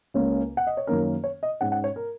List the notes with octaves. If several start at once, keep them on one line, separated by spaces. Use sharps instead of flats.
C#2 C#3 A#3 C#4
F#5
D#5
C#5
F#2 D#3 A#3 C#4 A#4
C#5
D#5
G#2 G#3 C#4 F#5
F#5
C#5
A#4